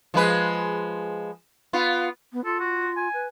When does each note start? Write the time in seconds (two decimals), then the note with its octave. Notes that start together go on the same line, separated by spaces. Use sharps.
0.14 F3 G#3 B4
1.73 B3 F4
2.33 B3
2.45 F4 A4
2.60 F#4
2.97 G#5
3.13 B4